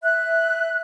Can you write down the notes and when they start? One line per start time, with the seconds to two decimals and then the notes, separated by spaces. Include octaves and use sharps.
0.03 E5 F#6